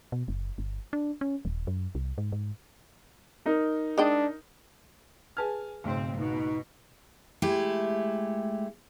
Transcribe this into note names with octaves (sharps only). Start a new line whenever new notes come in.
B2
F#1
G1
D4
C#4
D#1
F#2
C2
G#2
G#2
D#4 A#4
G#3 D4 D#5 G5
G#4 B4 G#5 A5 F6 G#6
B1 G#2 C#3 A3 C4
B2 D#4
G#3 A3 E4 G4